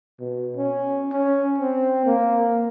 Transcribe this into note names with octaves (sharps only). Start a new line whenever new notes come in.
B2
C#4
C#4
C4
A#3